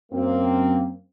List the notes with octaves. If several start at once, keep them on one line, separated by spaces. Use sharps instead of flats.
F#2 A#3 C4